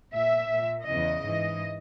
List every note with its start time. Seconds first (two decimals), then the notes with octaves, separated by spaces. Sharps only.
0.11 A#2 E5
0.48 A#2
0.85 E2 C#3 E3 D#5
1.23 G#2 E3